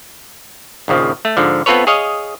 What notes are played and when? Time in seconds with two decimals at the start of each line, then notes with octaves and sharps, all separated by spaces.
0.88 A#1 D#2 C#3 F3
1.25 A3
1.37 G#2 D3 F3
1.66 B3 C4 F4 A4 B4 C#5
1.87 G#4 C#5 D#5 F5